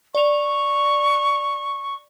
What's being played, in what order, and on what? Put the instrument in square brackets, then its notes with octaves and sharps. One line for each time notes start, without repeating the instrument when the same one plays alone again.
[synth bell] D5 F7 [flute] C#6